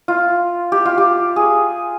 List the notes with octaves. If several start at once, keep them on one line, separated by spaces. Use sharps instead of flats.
F4
G4
F4
G4
G#4